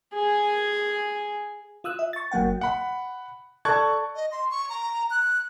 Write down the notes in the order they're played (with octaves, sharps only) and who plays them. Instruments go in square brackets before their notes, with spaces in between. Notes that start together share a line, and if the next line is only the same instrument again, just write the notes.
[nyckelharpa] G#4 G#5
[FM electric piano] F4 D#6 E6 F#6
E5
C#6 A6
G1 F#3 A#3 F#5 G5
[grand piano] F#5 B5
A4 D5 A5 C#6 F#6 G#6
[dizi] D#5
C6
C#6
A#5
F#6